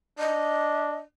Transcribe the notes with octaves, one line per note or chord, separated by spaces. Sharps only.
D4 D#5